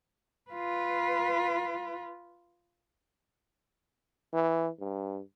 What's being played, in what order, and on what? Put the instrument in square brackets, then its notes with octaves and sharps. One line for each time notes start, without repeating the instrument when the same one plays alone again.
[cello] F4 B4
[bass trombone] E3
G2